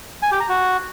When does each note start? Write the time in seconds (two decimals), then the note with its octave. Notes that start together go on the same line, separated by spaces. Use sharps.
0.22 G#5
0.31 G4
0.40 A#5
0.49 F#4